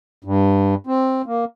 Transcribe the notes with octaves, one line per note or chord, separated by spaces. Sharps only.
G2
C4
A#3